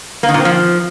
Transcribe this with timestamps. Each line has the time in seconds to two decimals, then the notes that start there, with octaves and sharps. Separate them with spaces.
0.23 A#3
0.29 D#3
0.34 A#2
0.40 C4
0.45 F3